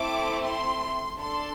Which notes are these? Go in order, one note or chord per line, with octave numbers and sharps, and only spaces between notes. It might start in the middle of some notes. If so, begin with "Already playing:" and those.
Already playing: A3 C4 E4 D6
C6
D4 A4 C6